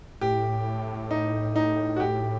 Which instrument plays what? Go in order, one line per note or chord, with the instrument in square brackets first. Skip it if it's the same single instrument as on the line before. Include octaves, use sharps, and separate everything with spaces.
[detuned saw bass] A2 [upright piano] G4
[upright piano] D#4
D#4
F#4
G4